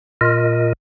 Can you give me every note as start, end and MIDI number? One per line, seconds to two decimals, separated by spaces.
0.21 0.73 46
0.21 0.73 65
0.21 0.73 70
0.21 0.73 75